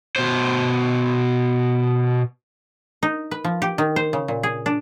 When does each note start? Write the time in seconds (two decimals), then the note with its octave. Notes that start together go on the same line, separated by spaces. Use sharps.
0.16 B2 C5
3.03 D#4
3.31 B4
3.44 F3
3.62 G4
3.78 D#3
3.96 C5
4.13 C#3
4.28 A#2
4.43 G#4
4.66 D4